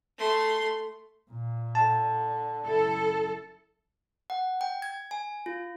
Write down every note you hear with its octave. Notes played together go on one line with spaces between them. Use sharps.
A3 C6
A#2
D3 A5
F#1 E4 A4
F#5
G5
G#6
G#5
F4